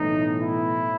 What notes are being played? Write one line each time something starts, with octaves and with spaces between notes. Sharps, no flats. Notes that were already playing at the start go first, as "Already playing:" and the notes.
Already playing: B1 A2 E3 D#4
E4